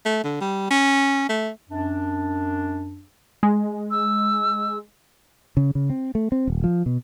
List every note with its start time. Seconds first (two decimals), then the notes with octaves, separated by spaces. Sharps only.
0.05 A3
0.24 D3
0.41 G3
0.70 C#4
1.29 A3
1.69 F#2 D4
3.43 G#3
3.91 E6
5.57 C#3
5.75 C#3
5.90 C4
6.15 A3
6.32 C4
6.47 D#1
6.64 F3
6.86 B2